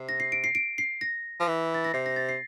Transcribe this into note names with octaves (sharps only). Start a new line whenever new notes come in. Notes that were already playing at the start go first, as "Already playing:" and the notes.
Already playing: C3
A#6
C7
D7
C7
D7
C7
A#6
F3
E3
A6
A#6
C3 C7
A#6
A6
C7